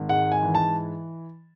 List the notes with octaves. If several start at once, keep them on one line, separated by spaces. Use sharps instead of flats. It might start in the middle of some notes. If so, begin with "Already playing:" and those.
Already playing: G#1
G#2 F#5
G#5
E3
A5